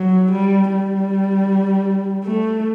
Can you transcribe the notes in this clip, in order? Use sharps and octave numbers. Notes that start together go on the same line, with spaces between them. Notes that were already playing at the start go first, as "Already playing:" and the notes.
Already playing: F#3
G3
G3
A3